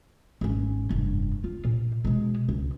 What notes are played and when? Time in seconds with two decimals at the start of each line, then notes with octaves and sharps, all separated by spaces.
0.41 G#1 C#4
0.90 F1 G2
1.44 F4
1.65 A#2
2.05 B2 G#3
2.49 C#2